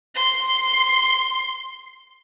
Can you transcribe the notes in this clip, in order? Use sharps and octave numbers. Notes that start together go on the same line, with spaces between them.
C6